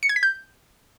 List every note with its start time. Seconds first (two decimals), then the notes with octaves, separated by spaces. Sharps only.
0.03 C#7
0.09 G#6
0.16 B6
0.23 G6